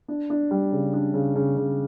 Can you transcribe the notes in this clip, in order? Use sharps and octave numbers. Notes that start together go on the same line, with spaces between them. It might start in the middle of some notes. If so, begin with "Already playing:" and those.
D4
D4
G3
C#3
D4
C#3
C#3
C#3